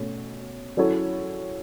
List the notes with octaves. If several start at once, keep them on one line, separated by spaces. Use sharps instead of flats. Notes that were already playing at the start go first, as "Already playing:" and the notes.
Already playing: B2 A3 C#4
F#3 C#4 E4 A4 C#5